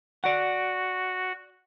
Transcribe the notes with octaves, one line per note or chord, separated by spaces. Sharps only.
F#4 D5 F#5